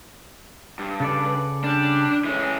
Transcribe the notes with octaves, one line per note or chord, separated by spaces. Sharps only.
G2
C#3 A4 B4 D5
G3 D4
E3 G#3 C#4